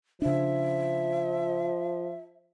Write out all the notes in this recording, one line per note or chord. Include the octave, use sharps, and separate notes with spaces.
C#3 F3 D4 E5